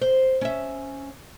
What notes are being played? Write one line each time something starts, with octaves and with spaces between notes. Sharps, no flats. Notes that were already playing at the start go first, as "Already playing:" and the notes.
C5
C#4 E5